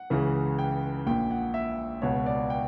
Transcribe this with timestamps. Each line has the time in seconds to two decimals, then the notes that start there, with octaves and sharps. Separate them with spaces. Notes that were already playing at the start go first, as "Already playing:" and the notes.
Already playing: F#5
0.10 C#2 C#3 E3
0.59 G5
1.07 A#1 A#2 G5
1.31 F#5
1.54 E5
2.02 C#2 B2 C#5
2.26 D5
2.50 G5